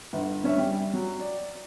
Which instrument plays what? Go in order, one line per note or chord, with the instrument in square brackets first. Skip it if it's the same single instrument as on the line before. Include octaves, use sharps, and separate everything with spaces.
[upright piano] G1
G2 C#4 E5
G3
F#3
D5